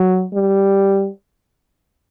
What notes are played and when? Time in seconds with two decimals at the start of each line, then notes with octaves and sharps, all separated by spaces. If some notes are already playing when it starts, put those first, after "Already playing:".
Already playing: F#3
0.34 G3